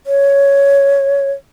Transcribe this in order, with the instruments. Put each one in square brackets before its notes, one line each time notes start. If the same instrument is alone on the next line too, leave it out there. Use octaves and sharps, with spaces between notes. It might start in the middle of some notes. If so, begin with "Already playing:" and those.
[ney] C#5